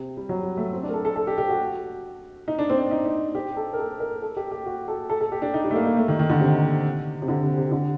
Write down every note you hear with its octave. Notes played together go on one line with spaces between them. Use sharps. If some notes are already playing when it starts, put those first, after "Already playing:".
Already playing: C3
G3
F#3
G3
A3
C4
D4
A#4
A4
A4
A4
G4
G4
F#4
D#4
D4
C4
D4
D#4
D#4
G4
A4
A#4
A4
A#4
A4
G4
G4
F#4
A4
A4
A4
G4
D4
D#4
G3
A3
A#3
A#3
A3
D#3
D#3
D3
C3
C3
D3
C3
C3
D3